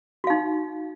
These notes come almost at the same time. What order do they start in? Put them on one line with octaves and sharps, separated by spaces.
F#4 F5 D#4